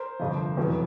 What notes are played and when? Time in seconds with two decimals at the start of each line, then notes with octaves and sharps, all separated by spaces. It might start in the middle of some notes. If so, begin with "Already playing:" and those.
Already playing: A#4 C5
0.19 G1 F2 C3 F3
0.57 F1 E2 B2 F#3 B3